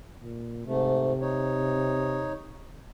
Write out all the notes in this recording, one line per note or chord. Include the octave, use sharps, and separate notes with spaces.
A#2
G#2 C3 A3
D#4 C#5